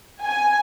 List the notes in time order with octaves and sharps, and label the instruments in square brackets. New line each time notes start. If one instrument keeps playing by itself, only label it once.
[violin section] G#5